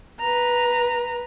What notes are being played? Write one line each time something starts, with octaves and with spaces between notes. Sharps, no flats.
B4 A#5